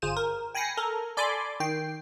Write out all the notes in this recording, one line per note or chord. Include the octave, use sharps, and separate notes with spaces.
G1 F4 G#4 C5 D#7 E7
A#4
G5 G#5 B5 A#6 C7 C#7
A4 A#4 A#5
A4 D5 G#5 B5 C6 D6
D#3 G5 C7